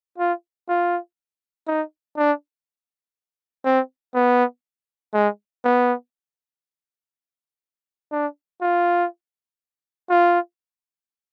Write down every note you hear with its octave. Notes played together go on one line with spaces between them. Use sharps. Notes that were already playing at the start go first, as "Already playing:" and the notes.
F4
F4
D#4
D4
C4
B3
G#3
B3
D4
F4
F4